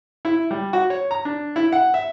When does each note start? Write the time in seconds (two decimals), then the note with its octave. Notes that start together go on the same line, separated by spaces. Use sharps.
0.25 E4
0.51 G3
0.73 F#4
0.90 C#5
1.11 A#5
1.25 D4
1.56 E4
1.72 F#5
1.94 E5